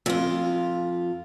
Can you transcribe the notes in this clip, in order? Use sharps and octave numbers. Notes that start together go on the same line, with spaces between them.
F2 F4